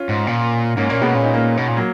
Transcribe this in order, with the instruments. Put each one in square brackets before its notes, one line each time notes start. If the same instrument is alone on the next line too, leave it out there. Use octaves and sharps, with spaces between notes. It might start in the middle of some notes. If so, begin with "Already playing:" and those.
Already playing: [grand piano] C#4 F4
[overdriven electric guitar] G#2
A#2
[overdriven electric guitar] G#2 [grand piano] A#3 C#4
[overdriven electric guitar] A#2 [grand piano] A#3 C#4
[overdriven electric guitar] B2 [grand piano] G#3 B3
[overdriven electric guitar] A#2 [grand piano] C#4
[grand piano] D#4
A#3 C#4
[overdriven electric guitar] B2
A#2
[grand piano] F#3 A#3